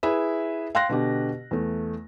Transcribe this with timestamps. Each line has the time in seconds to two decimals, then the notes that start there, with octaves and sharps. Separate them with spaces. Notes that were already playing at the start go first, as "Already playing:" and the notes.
0.03 E4 G#4 B4 E5
0.75 F5 G5 C6 F#6 A#6
0.89 B2 D3 G4
1.51 E2 A3